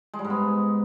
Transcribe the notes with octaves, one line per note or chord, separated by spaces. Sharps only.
G#3
G3
G#2
B3